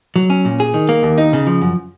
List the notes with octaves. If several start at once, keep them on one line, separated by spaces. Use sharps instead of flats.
F#3
C#4
A#2
G#4
D#3
A#3
D#2
D#4
C#3
F3
F#2